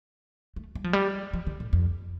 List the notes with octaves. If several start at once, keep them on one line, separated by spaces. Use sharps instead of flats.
A3
G3
F3
G3
F3
D3
A2
F2